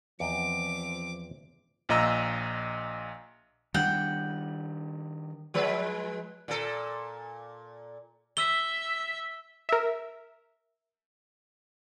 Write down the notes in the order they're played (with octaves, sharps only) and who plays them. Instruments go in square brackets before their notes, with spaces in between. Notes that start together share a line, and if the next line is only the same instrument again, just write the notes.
[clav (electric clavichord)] E2 D#5 G5 [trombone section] F3 C4 [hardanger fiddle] D6
[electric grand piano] A#1 A#2 D#5 A#5 E6
[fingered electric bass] D#3 G3 D4 [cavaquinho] F#5 G5
[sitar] F3 G#3 B4
A#2 A4
[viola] E5 [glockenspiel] E6 G7
[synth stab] A#4 E5